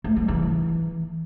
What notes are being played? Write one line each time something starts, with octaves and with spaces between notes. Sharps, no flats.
A3
G3
E3